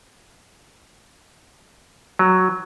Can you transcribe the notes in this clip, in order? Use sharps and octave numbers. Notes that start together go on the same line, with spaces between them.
F#3